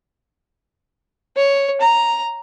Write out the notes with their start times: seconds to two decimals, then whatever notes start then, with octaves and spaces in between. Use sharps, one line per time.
1.37 C#5
1.81 A#5